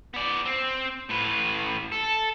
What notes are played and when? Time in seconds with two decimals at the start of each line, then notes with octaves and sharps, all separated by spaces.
0.14 B3 D5
0.46 C4
1.09 A2 B4
1.92 A4